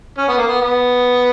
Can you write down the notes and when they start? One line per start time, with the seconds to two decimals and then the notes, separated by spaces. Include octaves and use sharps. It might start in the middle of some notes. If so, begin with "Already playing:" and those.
0.18 C#4
0.29 B3
0.38 A#3
0.48 B3
0.61 B3